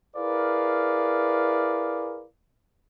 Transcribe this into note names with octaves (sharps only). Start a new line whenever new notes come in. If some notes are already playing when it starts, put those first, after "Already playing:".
E4 G#4 A#4 B4 D5 F5